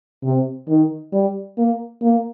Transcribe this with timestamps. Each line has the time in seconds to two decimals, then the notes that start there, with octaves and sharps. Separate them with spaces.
0.24 C3
0.69 D#3
1.13 G3
1.58 A#3
2.02 A#3